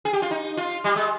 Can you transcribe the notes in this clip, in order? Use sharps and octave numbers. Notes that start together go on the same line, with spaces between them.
G#4
G4
F4
D#4
F4
G3
G#3